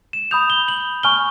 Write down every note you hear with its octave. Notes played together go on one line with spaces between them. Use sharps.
E7
B5 D#6 G6 F7
G7
F#7
G#5 C#6 F6 G7